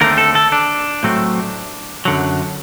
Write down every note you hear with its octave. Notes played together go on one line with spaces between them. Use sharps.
D#2 D3 A3 C4 A#4
A4
A4
D4
A2 F#3 A3 C4
F#2 D3 F#3